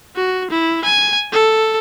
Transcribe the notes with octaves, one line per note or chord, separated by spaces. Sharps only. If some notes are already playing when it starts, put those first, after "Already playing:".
F#4
E4
G#5
A4